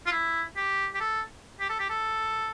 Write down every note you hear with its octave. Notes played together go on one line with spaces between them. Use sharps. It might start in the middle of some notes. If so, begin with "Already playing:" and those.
F4
E4
G4
G4
A4
G4
A4
G4
A4